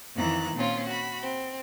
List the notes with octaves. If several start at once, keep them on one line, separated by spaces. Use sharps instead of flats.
F2 D#3 E3 A#5 F#6
A#2 C4 C#4 F4
F#4 B5
C4